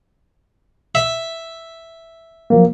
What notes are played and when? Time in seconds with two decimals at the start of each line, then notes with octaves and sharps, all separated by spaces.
0.95 E5
2.50 F3 F#3 A#3